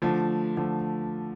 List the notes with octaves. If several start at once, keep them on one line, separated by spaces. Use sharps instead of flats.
D3 F3 A3
D3 F3 A3